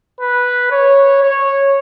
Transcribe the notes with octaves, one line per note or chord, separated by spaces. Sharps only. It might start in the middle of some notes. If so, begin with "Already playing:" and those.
B4
C#5
C#5